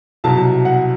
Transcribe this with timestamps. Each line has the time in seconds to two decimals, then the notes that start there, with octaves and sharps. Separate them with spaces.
0.24 C2 B2 F#3 A5
0.65 F#5